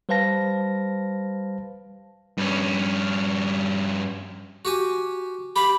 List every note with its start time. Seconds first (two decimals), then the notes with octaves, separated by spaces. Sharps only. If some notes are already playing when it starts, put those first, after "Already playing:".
0.09 G3 B4 C5 F5 A5 A#6
2.37 G2 C#4
4.65 F#4 G4 G#5
5.56 G4 F5 B5